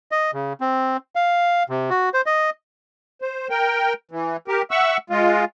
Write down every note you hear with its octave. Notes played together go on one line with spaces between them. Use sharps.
D#5
C#3
C4
F5
C3
F#4
C5
D#5
C5
A#4 G5
E3
G4 A#4
E5 F#5 C#6 E6
G#3 F4